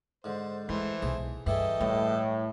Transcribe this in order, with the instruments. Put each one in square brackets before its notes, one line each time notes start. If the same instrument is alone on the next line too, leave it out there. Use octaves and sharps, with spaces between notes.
[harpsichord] G#2 D3 [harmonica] C5
[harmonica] E3 A3 C5 [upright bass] G#3
[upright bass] B1 [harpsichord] G#4
[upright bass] G2 [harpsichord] E3 E4 G#4 [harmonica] A4 D#5 G5
[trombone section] A2 [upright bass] G3